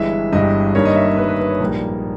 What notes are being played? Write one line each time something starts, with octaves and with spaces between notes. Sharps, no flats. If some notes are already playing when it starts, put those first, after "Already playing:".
Already playing: G1 G2 E3 G#3 E5
G1 G2 E3 G#3 D#5
G2 D#3 A#3 C#5
D#5
E5
C#5
G2 D#3 A#3 B4
B4
B4
C#5
A#1 G#2 G3 A#3